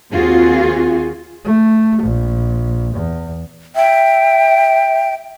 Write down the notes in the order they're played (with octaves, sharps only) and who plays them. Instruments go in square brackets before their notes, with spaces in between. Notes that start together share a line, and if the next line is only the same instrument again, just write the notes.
[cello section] D#2 C4 F4 F#4 G#4
[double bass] A3
A#1
E2
[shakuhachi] E5 [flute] G5